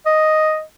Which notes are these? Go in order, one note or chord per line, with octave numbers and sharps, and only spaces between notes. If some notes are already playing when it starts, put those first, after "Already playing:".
D#5